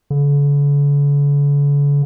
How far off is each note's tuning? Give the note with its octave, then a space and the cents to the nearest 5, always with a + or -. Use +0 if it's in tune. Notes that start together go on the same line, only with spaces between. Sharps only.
D3 -45